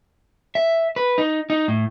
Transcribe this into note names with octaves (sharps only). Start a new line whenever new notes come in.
E5
B4
D#4
D#4
A2